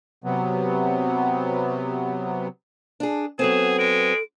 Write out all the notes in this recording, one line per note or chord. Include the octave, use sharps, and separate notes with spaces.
C3 F#3 B3
D4 G#4
F#3 B3 C4 G#4 A4 E7
G#3 D7